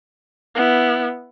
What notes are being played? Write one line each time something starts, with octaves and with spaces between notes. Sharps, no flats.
B3 E4